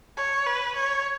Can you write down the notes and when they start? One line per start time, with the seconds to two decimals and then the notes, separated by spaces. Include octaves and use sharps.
0.17 C#5
0.47 B4
0.76 C#5